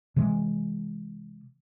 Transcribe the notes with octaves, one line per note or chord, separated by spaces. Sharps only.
C3 E3 G#3